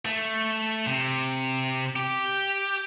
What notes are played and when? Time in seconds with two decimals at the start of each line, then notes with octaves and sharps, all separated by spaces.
0.05 A3
0.87 C3
1.96 G4